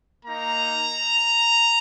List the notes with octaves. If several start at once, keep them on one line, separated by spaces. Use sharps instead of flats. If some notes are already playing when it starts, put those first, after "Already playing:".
A#3 D#4 A#5